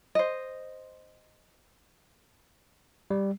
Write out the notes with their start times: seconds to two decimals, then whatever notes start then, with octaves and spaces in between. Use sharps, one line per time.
0.15 C5 D#5
3.11 G3